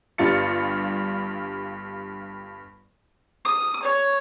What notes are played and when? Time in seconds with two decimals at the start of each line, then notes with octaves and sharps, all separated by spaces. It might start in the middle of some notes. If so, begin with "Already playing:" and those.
0.18 G1 G2 G3 F4 A6 C#7
3.45 D#6
3.83 C#5